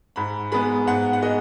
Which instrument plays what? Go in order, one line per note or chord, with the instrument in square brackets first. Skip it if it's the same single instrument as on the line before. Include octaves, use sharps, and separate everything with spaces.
[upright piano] G#2 B5
G#3 B3 B5
G#2 F#5
F#5
G#3 D#5